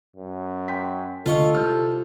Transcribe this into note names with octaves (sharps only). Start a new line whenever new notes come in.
F#2
G5 C6 B6
D2 F4 A4 C#5 D#5 F5
C2 F6 G6